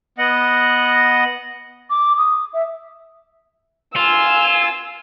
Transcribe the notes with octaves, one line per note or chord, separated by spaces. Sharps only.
B3 D#5 F#5
D6
D#6
E5
F4 G#5 E6